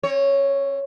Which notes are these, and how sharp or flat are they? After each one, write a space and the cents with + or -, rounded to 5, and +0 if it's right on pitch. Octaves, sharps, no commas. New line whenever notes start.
C4 +45 C#5 +0